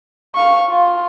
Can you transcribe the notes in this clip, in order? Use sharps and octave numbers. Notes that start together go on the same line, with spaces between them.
F5 C#6
F4